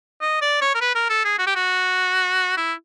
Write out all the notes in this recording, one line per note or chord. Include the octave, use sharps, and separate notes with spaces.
D#5
D5
C#5
A#4
B4
A#4
A4
G#4
F#4
G4
F#4
E4